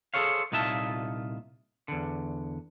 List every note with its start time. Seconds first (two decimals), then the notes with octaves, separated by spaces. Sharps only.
0.14 G#4 A4 C5 C#5 F5
0.52 C2 A#2 D#4 F4 E5 A5
1.88 E2 D3